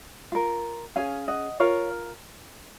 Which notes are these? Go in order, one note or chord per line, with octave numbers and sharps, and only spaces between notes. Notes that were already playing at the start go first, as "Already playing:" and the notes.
F4 A#4
C#4 G#4 F5 G#5
D#5 F#5
F4 A#4 C#5 F5